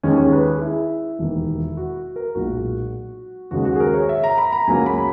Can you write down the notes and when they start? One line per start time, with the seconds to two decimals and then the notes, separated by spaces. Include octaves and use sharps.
0.03 D#2 D#3 G#3 C#4
0.18 C#4
0.32 B4
0.47 G#4
0.61 E4
1.19 E1 D#2 D#3 A#3
1.77 F#4
2.16 A#4
2.35 B1 A#2 G#3 F#4
3.51 D#2 C#3 G#3 F#4
3.65 F#4
3.76 G#4
3.80 A#4
3.94 C#5
4.09 E5
4.24 A#5
4.38 B5
4.53 A#5
4.67 C#2 C#3 F#3 A#3 G#5
4.86 B5